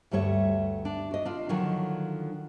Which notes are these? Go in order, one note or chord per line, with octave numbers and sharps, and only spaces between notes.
D2 G2 G3 A3 C#5 E5
D4
F#4 D#5
D4 F4
D3 D#3 F3 F#3